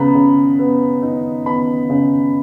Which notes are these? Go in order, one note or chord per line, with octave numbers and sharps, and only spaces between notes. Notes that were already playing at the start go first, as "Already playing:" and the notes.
Already playing: C#3 B3 A#5 B5
C#3
B3
D#4
B3 B5
C#3